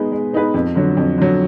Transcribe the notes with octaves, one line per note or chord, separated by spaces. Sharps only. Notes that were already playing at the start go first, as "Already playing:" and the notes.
Already playing: G#3 B3 D#4 G#4 B4
G#3
B3 D#4 G#4 B4
F2
D3 F#3
F2
D3 F#3